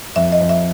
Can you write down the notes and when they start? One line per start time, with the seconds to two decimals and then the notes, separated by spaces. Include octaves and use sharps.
0.16 F2 E5
0.32 D#5
0.40 F2
0.49 E5